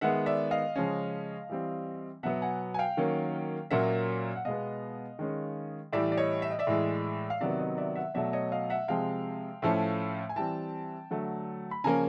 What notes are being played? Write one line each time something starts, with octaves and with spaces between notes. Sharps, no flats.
D#3 G#3 B3 E5 F#5
D5 E5
D#5 F5
C#3 F3 G#3 C#4
E3 G3 C4
B2 F#3 B3 E5 F#5
F#5 G#5
G#5
F5 G5
D#3 F#3 A#3 C#4
A#2 F#3 A#3 C#4 E5 F#5
F#5
B2 G#3 B3 D#5 F5
D#3 G#3 C#4
A2 E3 G3 D5 E5
D5
C#5 D#5
E5
D#5
D5 E5
A2 E3 G#3
F5
C3 D#3 F#3 B3 D5 E5
C#5 D#5
D5 E5
E5 F#5
B2 F#3 A3 D5 E5
C#5 D#5
D#5 F5
E5 F#5
C3 F3 G#3 F5 G5
A2 F3 A3 C#4
G#5
E3 G3 C4 G5 A5
D3 F#3 A3
B5
C#3 F3 A#3 C#4 G#5 A#5